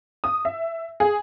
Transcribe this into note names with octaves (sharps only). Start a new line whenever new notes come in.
D#6
E5
G#4